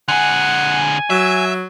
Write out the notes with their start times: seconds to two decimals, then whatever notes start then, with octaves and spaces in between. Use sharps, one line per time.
0.08 D3 G#4 F#5 G#5
1.10 F#3 E5